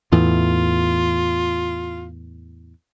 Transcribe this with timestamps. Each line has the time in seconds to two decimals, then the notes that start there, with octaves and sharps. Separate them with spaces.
0.12 E2 A2 E3 F4